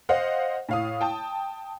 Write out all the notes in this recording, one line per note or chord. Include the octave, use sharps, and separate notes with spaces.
C5 D#5 F5 F#5
A2 F5 D#6
G5 A5 D#6